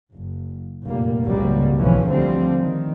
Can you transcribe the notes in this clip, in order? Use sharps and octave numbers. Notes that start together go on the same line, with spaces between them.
F#1
F1 F#2 A#2 G3 A#3
G#1 C#2 C3 F#3 G3 A#3
B1 G#2 E3 F3 C#4
D2 D3 F3 G3 C4
D#3